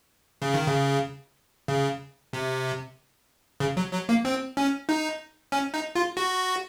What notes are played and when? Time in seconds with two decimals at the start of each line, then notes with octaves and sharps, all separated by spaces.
0.42 C#3
0.54 D#3
0.68 C#3
1.68 C#3
2.33 C3
3.60 C#3
3.77 F#3
3.93 F#3
4.09 A#3
4.25 C4
4.57 C#4
4.89 D#4
5.52 C#4
5.74 D#4
5.95 F4
6.17 F#4